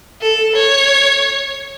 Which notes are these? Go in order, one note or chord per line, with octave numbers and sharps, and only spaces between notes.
A4
C#5